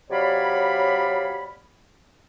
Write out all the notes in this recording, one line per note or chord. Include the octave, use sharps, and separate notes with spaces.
C3 F#3 C#5 D5 F5 B5